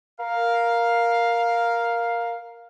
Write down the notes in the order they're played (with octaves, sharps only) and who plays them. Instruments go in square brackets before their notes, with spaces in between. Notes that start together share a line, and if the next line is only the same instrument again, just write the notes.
[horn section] A#4 F5